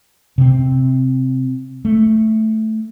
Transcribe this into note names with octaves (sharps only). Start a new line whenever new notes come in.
C3 C4
A3